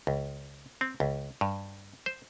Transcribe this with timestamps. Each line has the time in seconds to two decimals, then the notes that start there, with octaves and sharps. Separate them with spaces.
0.07 C#2
0.81 C4
1.00 C#2
1.41 G2
2.06 C5